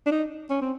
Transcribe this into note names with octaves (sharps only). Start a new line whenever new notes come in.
D4
D#4
C#4
C4